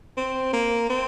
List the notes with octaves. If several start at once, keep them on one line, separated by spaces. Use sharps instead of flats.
C4
A#3
C4